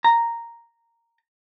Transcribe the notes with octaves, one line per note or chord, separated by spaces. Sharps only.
A#5